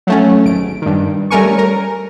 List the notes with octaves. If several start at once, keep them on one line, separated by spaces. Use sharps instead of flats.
F#3 A3 C#4
G#1 D7
G2 D#3
G3 A3 C#4 A#4 G#5 C#6
A#4